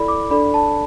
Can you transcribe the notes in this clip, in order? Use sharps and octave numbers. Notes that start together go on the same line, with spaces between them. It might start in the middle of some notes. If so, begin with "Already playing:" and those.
Already playing: E4 A4 D5 B5
D6
D4 A4 D5 B5
A5